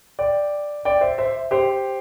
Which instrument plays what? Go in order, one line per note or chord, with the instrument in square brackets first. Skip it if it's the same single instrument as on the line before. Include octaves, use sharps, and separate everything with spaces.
[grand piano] D5 G5
D5 G5
C5 E5
C5 E5
G4 C5